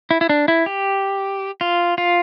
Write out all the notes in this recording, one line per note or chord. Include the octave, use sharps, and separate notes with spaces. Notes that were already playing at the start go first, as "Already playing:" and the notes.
E4
E4
D4
E4
G4
F4
F4